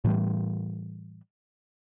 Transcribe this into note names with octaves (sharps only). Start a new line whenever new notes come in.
A2 E3 G3